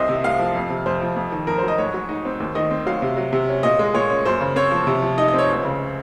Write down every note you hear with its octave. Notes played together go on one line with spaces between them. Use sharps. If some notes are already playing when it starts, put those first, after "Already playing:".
Already playing: C2 C4 D#5
C3
C2 F5
F3
F2
C3
F2 C5
F3
F2
D#3
F2 A#4
C5
F#3
D#5
G#2 C#5
F#3
D#4
C4
D#2
D#3 D#5
C4
F#3 F5
C3
F#3
C3
C#4
A#2 D#5
G#3
A#2 C#5
C#4
F#2 C5
C#3
C4 C#5
F3
C3
F3
D#4 D#5
D#5
C4 C#5
C#2
C#3